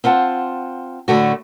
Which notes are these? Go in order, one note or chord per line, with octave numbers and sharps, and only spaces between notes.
C4 F4 F#5 A5
A2 D3 A3 F#4